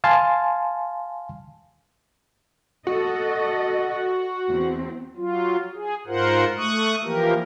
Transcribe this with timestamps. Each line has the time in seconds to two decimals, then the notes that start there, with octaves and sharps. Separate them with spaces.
0.04 F5 G#5 A5 C6
2.87 F#4 A4 D#5
4.49 E2 C4
5.17 F#3 F4
5.73 G#4
6.07 G#2 F4 A#4 C5 F#5
6.57 A3 C#6 D#6 F#6
7.03 E3 F3 A#3 G4 A#4